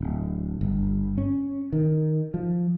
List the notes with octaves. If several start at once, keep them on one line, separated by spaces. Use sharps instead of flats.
D1
G1
C#4
D#3
F3